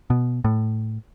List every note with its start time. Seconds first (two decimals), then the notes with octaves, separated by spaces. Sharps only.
0.10 B2
0.44 A2